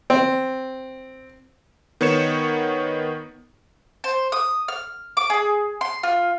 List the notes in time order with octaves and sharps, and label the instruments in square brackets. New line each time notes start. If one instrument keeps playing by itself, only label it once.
[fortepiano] C4
[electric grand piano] D#3 B3 D#4 C#5 C#7 E7
[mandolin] C5
D#6
F6
D6
G#4
C6
F4